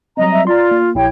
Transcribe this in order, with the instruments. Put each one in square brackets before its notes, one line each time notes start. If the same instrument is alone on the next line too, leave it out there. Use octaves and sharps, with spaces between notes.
[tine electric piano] F#3 G3 C4 [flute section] D#5 A#5
[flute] E5
[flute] F4 [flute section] D5 [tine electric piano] A#5 C6
[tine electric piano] A#3
[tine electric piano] A#1 E4 [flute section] G4 C#5 G5